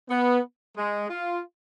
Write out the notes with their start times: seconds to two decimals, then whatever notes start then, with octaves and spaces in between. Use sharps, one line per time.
0.09 B3
0.76 G#3
1.10 F4